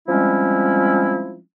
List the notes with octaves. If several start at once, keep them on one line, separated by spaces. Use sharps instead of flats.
F3 G3 G#3 C4 C#4 E4